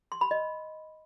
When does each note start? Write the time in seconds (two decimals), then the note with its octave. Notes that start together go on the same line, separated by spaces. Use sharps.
0.12 C6
0.21 B5
0.31 D#5